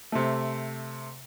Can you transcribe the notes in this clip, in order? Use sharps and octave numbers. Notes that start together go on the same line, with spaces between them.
C3 A3